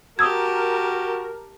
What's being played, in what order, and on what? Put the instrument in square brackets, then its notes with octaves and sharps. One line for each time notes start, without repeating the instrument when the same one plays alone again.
[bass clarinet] F#4 [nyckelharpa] G4 A5 [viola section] A#4 [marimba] D#6 E6 G#6